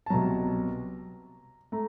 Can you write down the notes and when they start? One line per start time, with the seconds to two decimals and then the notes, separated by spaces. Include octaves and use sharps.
0.06 A5
0.10 C2 B2 F#3 A#5
1.72 A3 A#5